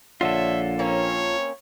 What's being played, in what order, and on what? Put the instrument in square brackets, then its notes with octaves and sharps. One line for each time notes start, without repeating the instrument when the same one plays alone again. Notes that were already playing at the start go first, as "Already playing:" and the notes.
[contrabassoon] A#1 [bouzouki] D3 C#5 [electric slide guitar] F4 A4 [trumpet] E5
[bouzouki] A#3 C4 C#4 [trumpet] C#5